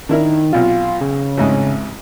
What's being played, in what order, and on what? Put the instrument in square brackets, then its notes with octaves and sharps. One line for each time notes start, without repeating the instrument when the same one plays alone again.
[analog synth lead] D#3 [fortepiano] D4 E4 A#4
[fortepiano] B1 C3 [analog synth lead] F4
[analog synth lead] C#3
[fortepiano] A1 F2 G#2